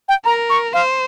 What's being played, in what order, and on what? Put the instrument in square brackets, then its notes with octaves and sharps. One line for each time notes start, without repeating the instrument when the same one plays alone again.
[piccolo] G5
[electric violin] A#4 [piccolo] A#5
[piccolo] C#6
[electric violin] C5 [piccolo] F5